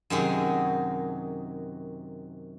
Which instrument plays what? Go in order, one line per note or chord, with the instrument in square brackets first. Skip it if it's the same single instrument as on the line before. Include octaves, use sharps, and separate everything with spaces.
[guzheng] F#2 C3 D#3 F#3 G4 G#4